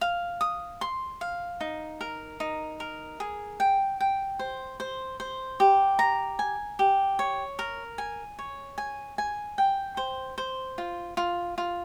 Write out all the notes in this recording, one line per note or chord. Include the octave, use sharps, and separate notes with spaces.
F5
D#6
C6
F5
D#4
A#4
D#4
A#4
G#4
G5
G5
C5
C5
C5
G4
A#5
G#5
G4
C#5
A#4
G#5
C#5
G#5
G#5
G5
C5
C5
F4
F4
F4